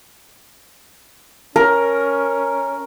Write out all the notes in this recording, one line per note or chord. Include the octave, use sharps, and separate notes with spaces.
C#4 A#4